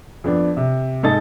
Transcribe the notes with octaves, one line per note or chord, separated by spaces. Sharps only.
F2 B3 D4
C3
G#2 D#4 A4 D#5 D#6 A6